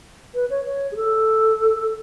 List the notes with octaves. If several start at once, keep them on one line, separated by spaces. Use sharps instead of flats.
B4
C#5
C#5
G#4
A4